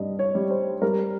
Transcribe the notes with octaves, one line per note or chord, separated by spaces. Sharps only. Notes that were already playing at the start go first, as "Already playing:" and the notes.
Already playing: G2 D#5
C#5
G3
C5
G3 A#4